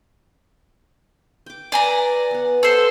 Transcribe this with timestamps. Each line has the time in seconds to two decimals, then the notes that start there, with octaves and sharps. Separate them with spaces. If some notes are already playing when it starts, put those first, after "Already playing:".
1.46 G5 D6
1.72 B4 D5 E5 G#5 A#5
2.31 B3 F#5
2.63 A4 C5 D#5